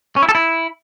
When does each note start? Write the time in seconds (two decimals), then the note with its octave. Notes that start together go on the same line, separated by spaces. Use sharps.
0.16 C#4
0.22 E4
0.29 A4
0.35 E4